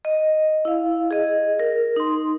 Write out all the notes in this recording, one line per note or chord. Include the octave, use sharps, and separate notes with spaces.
D#5
E4 F5
G#4 D#5
A#4
D#4 C6